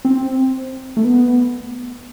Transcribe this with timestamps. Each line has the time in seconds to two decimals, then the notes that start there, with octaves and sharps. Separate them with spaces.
0.05 C4
0.97 A3
1.04 B3